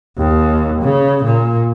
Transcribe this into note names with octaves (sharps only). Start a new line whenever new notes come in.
D#2
C#3
A#2